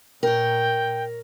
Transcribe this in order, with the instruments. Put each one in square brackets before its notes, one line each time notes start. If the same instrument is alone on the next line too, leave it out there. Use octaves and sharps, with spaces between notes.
[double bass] A#2 [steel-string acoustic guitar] A#4 C#5 [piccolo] G5